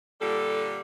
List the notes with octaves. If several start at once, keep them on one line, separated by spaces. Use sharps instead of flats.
A#2 D3 G3 A4